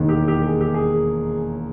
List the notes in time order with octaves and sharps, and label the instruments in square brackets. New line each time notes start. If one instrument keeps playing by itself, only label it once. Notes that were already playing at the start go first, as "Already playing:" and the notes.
Already playing: [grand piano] E1 D#2 D#3
G4
G4
G#4
G4
G#4